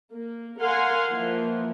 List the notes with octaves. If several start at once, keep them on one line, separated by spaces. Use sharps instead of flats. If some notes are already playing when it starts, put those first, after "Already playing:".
A#3
A#4 F5 F#5 G#5 C6
E3 F3 A#3